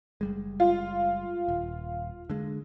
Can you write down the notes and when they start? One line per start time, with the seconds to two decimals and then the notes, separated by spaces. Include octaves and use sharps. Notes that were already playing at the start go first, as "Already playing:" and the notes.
0.21 F#1 G3 G#3
0.60 F4
1.48 D#1
2.30 D3 G#3